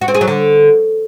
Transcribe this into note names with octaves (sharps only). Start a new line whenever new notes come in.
F#4
C4
G#4
F#3
D3